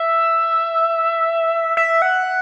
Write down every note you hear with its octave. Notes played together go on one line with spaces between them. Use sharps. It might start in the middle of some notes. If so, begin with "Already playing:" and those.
Already playing: E5
E5
F#5